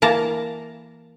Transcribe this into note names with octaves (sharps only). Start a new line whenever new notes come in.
E3 A#3 A5 A#5